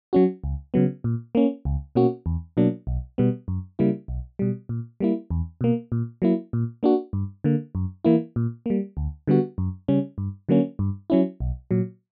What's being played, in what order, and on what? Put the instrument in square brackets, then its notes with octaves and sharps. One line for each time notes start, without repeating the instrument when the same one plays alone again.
[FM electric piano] F#3 C#4 F#4
C#2
C#3 F#3 B3
A#2
A#3 C#4
C#2
B2 A#3 C#4 F#4
E2
B2 F#3 A#3 D4
B1
B2 G3 B3
F#2
C#3 G3 A#3 E4
B1
B2 G3
A#2
G3 A#3 E4
E2
B2 A#3
A#2
F#3 A#3 E4
A#2
A#3 D4 F#4
G2
D3 A#3
F#2
E3 A#3 E4
A#2
G3 A#3
D2
D3 G3 B3 F#4
F#2
C#3 G3 C#4
G2
D3 F#3 A#3 C#4
G2
F#3 C#4 E4
B1
A#2 F#3